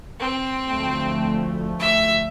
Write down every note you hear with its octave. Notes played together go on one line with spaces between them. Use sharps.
C4
D2 F3 A3
E5